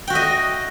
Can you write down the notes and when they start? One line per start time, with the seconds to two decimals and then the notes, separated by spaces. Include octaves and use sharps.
0.07 G5
0.10 F#4
0.13 E5
0.15 D#5